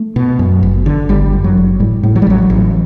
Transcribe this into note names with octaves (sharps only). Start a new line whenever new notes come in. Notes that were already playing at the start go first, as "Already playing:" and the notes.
Already playing: A3
B2
F#2
G1
D3
G1 G3
F#2
F#3
G1
A2 G3
A2
F#3
G3
A1 F#3
A1